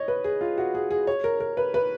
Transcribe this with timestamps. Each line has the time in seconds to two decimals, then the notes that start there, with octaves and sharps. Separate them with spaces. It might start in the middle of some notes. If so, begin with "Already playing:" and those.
Already playing: C#5 D#5
0.08 B4
0.24 G#4
0.41 F4
0.58 F#4
0.75 G#4
0.91 G#4
1.07 C#5
1.24 A#4
1.40 A#4
1.57 B4
1.74 B4